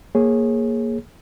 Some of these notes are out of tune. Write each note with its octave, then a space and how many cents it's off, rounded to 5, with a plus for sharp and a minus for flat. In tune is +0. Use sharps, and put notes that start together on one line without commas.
A#3 +0 G#4 +0 C#5 -20